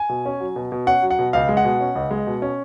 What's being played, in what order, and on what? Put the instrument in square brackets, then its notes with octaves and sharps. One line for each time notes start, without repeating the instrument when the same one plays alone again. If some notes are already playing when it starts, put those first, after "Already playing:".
Already playing: [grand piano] G#5
B2
C#4
F#3
B2
B2
C#4 F#5
F#3
F#5
B2
C#2 F5
G#3
F#5
B2
C#4
C#2
G#3
B2
C#4